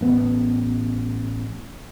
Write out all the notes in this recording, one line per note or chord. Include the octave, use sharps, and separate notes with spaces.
A1 B3